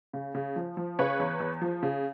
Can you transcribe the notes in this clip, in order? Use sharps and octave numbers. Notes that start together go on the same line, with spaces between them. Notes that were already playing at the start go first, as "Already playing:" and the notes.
C#3
C#3
F3
F3
C#3 B4 C#5
E2
E2
F3
C#3